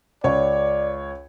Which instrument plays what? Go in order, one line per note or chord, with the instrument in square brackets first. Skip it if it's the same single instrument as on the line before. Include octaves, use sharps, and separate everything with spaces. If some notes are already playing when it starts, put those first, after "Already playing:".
[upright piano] C#2 C#5 [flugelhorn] D5